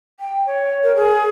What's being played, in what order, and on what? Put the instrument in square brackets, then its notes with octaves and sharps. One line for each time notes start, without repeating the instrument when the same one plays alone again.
[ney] G5
C#5
A#4
G#4